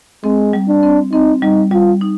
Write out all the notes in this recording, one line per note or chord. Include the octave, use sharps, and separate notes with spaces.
G#3 C4
G3
D4
C4
C4 D#4
G3 D#4
G3 F4
D#4